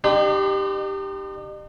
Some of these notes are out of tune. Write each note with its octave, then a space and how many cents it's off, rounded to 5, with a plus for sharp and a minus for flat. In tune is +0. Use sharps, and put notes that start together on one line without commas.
D#4 -45 G4 +0 C5 -35